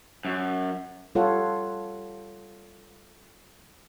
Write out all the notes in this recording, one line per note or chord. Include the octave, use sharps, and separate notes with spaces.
F#2
G3 F4 A4 C#5 F#5